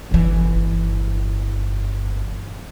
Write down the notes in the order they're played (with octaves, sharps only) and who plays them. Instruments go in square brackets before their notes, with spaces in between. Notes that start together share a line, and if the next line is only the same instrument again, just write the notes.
[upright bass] G1 E3